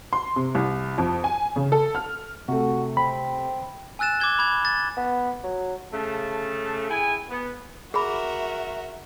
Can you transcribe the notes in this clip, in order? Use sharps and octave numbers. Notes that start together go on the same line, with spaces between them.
C6
C3
C2
F2
G#5
C#3
A4
F6
C3 A3 F#4
C4 B5
G#5 E6 F#6 A6 E7
D6 F#6 G#6 G7
B5 D6 G#6
A6
B3
F#3
C#3 A3 A5
E4 G#4 G5 G#5
B3
F#4 G#4 A#4 E5 B5